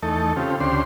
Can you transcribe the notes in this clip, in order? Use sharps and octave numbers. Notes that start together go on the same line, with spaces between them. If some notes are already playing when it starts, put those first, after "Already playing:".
E2 A3 D#4 A4
C#3 C4 F4 G4
D2 C#3 D4 G4 C5 C6